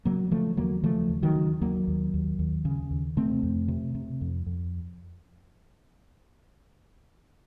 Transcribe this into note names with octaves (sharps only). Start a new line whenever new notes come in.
C#3 F#3 A#3
C#3 F3 A3
D#2 F#3 A#3
C#3 F3 A3
D#2
D#3 F#3
C#3
D#2 F#3 A#3
D#2
D#2
D#2
C#3
D#2
C3 A3 C4
F2
C3
C3
F2
F2